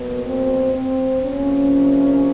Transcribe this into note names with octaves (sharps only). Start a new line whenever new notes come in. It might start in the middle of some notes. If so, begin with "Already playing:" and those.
Already playing: B2 F#3 A#3 B3
C4
C4
C3 F3 A#3 C#4